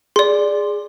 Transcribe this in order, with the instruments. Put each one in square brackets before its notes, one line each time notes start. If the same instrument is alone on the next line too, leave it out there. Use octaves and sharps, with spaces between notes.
[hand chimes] G#4 [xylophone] D5 C6